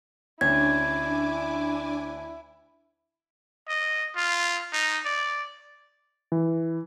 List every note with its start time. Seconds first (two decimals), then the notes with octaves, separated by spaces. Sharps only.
0.41 D2 C#4 D4 E4 G#5 D6 G#6
3.68 D#5
4.16 F4
4.73 D#4
5.05 D5
6.32 E3